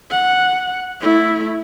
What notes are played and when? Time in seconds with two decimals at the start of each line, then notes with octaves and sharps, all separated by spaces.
0.11 F#5
1.01 A3 E4